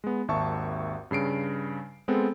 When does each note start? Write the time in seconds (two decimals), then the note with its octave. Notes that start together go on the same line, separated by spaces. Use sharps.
0.04 G#3 B3
0.28 G#1 D#2 E5 A5 C#6
1.11 G2 C#3 C7 D7
2.08 G#3 B3 C4 A4